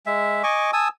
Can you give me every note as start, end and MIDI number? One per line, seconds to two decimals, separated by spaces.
0.06 0.43 56
0.06 0.43 76
0.44 0.71 75
0.44 0.71 80
0.44 0.71 85
0.44 0.71 86
0.73 0.88 80
0.73 0.88 81
0.73 0.88 87
0.73 0.88 88